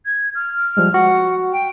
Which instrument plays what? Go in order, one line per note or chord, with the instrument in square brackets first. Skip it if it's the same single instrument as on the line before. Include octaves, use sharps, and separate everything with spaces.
[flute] G#6
F6
[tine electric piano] F3 G3 G#3
[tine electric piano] F#4 [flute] F#5
[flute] G5